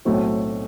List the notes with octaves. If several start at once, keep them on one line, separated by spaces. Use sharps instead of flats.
B1 A2 F#3 A3 C4